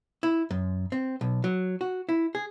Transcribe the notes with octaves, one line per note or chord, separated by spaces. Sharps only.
E4
F#2
C4
B1
F#3
F#4
E4
G#4